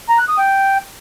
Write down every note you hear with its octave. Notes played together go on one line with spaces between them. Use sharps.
A#5
F#6
D#6
G5